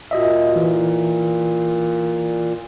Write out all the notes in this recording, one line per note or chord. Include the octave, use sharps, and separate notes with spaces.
A#2 F#4 D#5 E5
E3